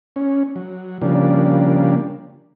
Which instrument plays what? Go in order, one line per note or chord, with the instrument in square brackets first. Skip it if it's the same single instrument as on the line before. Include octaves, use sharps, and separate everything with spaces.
[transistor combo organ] C#4
F#3
C#3 F3 G3 A#3 D4